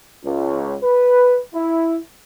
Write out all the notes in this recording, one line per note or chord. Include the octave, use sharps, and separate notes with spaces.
C#2
B4
E4